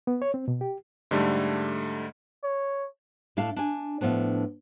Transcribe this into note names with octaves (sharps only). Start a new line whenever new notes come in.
B3
C#5
C4
B2
G4
G#2 D3 G3 A3
C#5
A2 D4 F5 A5
D4 G#5
A2 F3 B3 D4